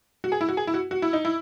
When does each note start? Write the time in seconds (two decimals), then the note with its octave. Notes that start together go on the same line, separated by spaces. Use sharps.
0.24 F#4
0.32 G#4
0.41 E4
0.49 F#4
0.57 G#4
0.67 E4
0.74 F#4
0.91 F#4
1.02 E4
1.13 D#4
1.25 E4